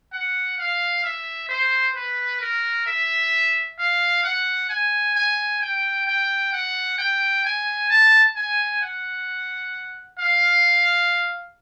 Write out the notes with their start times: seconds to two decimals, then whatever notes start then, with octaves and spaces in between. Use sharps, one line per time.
0.13 F#5
0.58 F5
1.04 E5
1.49 C5
1.96 B4
2.41 A#4
2.87 E5
3.79 F5
4.24 F#5
4.69 G#5
5.16 G#5
5.61 G5
6.07 G5
6.53 F#5
6.98 G5
7.45 G#5
7.90 A5
8.36 G#5
8.81 F#5
10.18 F5